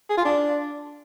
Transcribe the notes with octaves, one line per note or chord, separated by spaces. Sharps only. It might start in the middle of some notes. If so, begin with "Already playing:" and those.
G#4
F4
D4